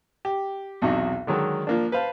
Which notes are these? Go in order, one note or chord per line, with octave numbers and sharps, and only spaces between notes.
G4
B1 E2 C3 D#4 F#4
D3 D#3 F#3 G#3 A4
F3 A#3 D4
B4 C5 F5 A5